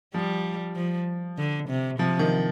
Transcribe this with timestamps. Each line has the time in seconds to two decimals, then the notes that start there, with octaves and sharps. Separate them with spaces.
0.14 F3 G3
0.76 F3
1.38 D3
1.69 C3
1.99 C3 F3
2.19 D#3